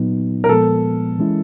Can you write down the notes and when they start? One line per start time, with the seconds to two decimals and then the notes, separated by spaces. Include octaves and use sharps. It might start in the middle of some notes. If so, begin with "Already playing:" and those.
Already playing: A#2 F#3 B3 D#4
0.44 A#4
0.49 A#2 F3 G#3 B3 A4
1.19 E3 G#3 C#4 E4